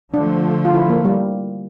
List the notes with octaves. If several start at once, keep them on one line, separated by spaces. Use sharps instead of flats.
D3 F3 A3 D4
F4
E4
A#3
G3